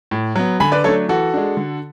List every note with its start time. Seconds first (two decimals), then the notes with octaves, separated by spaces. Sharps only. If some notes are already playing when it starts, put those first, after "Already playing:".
0.11 A2
0.36 F#3 B3
0.60 D3 G#5 B5
0.72 B4 D5
0.84 F#3 A3 D4 A4 C#5
1.09 E3 F#4 A4
1.34 G#3 D4
1.57 D3